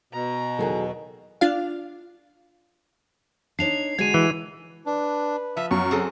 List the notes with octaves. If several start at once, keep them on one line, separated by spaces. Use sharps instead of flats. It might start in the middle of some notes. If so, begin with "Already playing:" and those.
B2 A#5
E2 D#3 F#3 F#4 G#4 A4
D4 F4 F5
D4 D#4 C#5 C7 F7
D3 G#3 F#4 G#6 D#7
E3
D4 B4
F3 E5
F#2 C#6
C4 G#4 A4